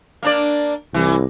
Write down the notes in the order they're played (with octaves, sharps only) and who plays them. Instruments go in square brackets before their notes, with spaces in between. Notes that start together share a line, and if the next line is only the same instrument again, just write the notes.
[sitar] A#3 D4 D5
[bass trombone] C2 [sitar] E3